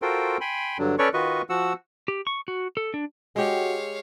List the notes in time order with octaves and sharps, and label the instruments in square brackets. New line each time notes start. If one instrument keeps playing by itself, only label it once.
[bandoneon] F4 F#4 A4 A#4 C5 G5
G5 G#5 B5 C6
G2 D3 F#3 D4
C#4 A4 B4 C#5 D5 C#6
D#3 F4 F#4 B4 D#5 C#6
F3 F#4 F#5 E6
[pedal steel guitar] G4
C#6
F#4
A4
D4
[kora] G#3 G4 [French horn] F#4 [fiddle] C#5 F5